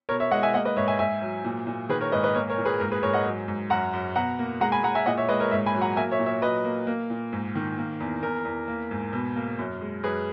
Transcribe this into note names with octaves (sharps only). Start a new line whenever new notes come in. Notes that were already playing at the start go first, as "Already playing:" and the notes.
B2 A#4 C#5
C#5 E5
G#3 D#5 F#5
E5 G#5
A#3 D#5 F#5
B4 D#5
G#2 C#5 E5
E5 G#5
G#2 E5 G#5
F#3
A#2
A#2
D#3 G#4 B4
A#4 C#5
G#2 B4 D#5
B4 D#5
A#3 A#4 C#5
A#4 C#5
A#2
G#4 B4
G#2 A#4
G#4 B4
G#2 A#4 C#5
D#5 F#5
F#3
G#2
F#2 F#5 A#5
F#2
B2 F#5 A#5
A#3
G#3 F#5 A#5
G#5 B5
G#3 F#5 A#5
E5 G#5
A#2 D#5 F#5
C#5 E5
G#3 B4 D#5
A#4 C#5
G#2 C#5 E5
G#5 B5
F#3
F#5 A#5
A#3 E5 G#5
C#5 E5
A#2
C#5 E5
F#3 B4 D#5
A#3
A#3
A#2
G#2
D#3
A#3
E2
E2 A#4
E2
A#3
G#2
B2
A#3
F#2
G#3
F#2 G#4 B4